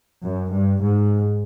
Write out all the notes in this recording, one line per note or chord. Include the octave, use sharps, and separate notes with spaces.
F#2
G2
G#2